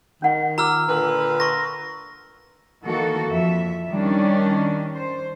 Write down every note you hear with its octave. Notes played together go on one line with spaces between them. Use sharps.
D#3 C#4 F#5
F4 A#5 D6 E6 F6
A#2 D3 B4
C6 C#6 A#6
D#3 E3 A#3 F#4 A4
F2 E5
D#3 G3 C#4 D4
C5